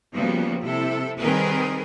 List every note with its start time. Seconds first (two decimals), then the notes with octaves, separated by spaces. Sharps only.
0.15 C#3 F3 G3 A#3 B3 F#4
0.61 C3 E4 A4
1.19 D#3 G3 C4 G#4 A#4 B4